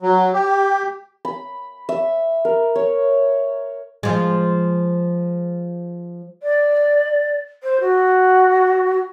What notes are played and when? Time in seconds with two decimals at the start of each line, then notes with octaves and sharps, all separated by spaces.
0.03 F#3
0.33 G4
1.25 B5
1.89 E5
2.45 A#4
2.75 C#5
4.03 F3 G#3
6.42 D5
7.63 C5
7.80 F#4